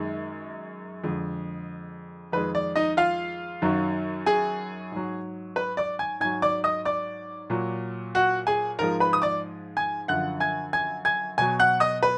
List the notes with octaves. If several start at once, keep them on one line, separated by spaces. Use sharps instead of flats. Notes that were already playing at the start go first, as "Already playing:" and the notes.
Already playing: F#2 D#3 G#3
F2 D3 G#3
F2 D#3 G#3 B4
D5
D#4 D#5
F4 F5
F#2 D#3 F#3
G#4 G#5
G#2 F#3
B4 B5
D5 D6
G#5 G#6
G#2 F#3 G#5 G#6
D5 D6
D#5 D#6
D5 D6
A#2 F#3
F#4 F#5
G#4 G#5
G#2 F3 G#3 A#4 A#5
B4 B5
D#6
D5 D6
G#5 G#6
F#2 D3 F3 F#5 F#6
G#5 G#6
G#5 G#6
G#5 G#6
B2 F#3 G#5 G#6
F#5 F#6
D#5 D#6
B4